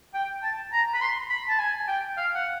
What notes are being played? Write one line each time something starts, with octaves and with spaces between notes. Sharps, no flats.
G5
A5
A#5
B5
C6
B5
A5
G#5
G5
F5
F#5